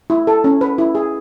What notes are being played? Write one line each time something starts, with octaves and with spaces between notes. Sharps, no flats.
E4
A4
C#4
B4
E4
G#4